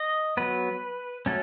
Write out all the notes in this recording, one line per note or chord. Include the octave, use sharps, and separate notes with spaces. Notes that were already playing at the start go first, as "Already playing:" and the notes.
Already playing: D#5
F#3 B3 B4
F#3 A3 C#4 A4